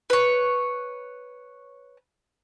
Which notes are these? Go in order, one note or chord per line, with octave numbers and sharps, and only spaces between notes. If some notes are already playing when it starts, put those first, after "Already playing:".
B4 C#5